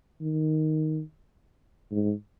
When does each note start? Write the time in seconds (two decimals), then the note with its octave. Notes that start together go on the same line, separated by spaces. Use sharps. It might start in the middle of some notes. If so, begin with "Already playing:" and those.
0.21 D#3
1.92 G#2